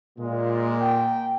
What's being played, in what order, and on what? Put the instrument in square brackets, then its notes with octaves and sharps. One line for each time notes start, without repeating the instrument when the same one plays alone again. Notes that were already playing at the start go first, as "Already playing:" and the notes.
[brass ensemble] A#2 [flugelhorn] G#3
[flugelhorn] G5